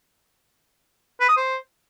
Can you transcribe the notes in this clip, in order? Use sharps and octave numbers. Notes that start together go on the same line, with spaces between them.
B4
D#6
C5